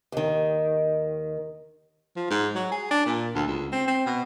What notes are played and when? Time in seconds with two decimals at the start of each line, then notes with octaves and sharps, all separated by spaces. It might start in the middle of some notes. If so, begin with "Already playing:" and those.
0.12 D#2 D#3
2.16 F3
2.31 G#2
2.55 F#3
2.72 G#4
2.91 D4
3.06 A#2
3.35 D2
3.47 C#2
3.72 C4
3.87 C4
4.06 B2